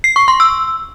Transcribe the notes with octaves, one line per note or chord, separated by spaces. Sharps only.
C7
C#6
C6
E6